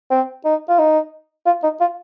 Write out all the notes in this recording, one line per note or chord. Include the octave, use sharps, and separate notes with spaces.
C4
D#4
F4
D#4
F4
D#4
F4